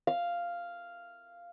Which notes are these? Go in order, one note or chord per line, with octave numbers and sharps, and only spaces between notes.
F5